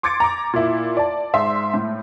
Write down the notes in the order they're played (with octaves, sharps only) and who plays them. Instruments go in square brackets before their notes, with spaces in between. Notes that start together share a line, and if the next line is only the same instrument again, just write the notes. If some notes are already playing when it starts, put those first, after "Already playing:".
[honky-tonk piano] C6 D6 G#6 A6 C#7 D7
A#5 D6
A#2 E4
D5 A5
G#2 E5 C6
A2